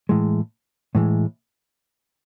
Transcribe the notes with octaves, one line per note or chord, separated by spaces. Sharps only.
A2 E3 G#3
A2 E3 G#3